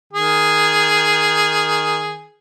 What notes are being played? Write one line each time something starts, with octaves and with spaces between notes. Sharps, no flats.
D#3 G#4